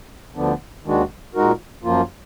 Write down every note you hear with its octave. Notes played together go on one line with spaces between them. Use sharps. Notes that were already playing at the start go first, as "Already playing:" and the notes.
D2 D3 F3 B3 D4
D#2 D#3 G#3 D4 F#4
A#2 G#3 D#4 F#4 A#4
F#2 F3 A#3 F4